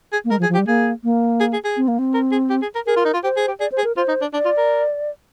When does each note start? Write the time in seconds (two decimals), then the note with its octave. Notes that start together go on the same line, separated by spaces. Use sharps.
0.12 G#4
0.25 A#3
0.31 G#3 A#4
0.39 F3
0.42 G#4
0.49 F3
0.54 G4
0.58 G3
0.67 A#3 G#4
1.04 A#3
1.40 G#4
1.53 G#4
1.64 G#4
1.77 C4
1.88 A#3
1.99 C4
2.14 A#4
2.31 G#4
2.50 G4
2.62 G#4
2.75 A#4
2.86 G#4 A#4
2.96 F4
3.05 D#4
3.13 F4
3.24 G4 C5
3.37 G#4
3.48 G4
3.60 G#4 D5
3.72 C5
3.78 G#4
3.84 A#4
3.96 F4 C5
4.08 D#4
4.21 D4
4.33 D4 D5
4.45 F4
4.57 A#4